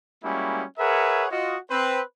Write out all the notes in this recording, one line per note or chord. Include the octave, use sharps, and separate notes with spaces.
G3 G#3 A#3 C#4 E4 F#4
G#4 A#4 B4 C#5 E5 F#5
F4 F#4 D#5
C4 B4 C5